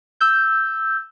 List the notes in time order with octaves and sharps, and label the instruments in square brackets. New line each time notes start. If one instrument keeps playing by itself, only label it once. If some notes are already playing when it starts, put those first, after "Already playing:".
[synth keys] E6 G6